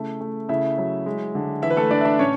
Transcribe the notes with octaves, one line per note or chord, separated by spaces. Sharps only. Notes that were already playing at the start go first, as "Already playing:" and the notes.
Already playing: C#3 A3 E4
A3
C#3 E4 E5
F#3
G#3
D3
E3 E4 E5
B4
A3 A4
A3 D4 D5
E5
D4 D5
A2 C#4 C#5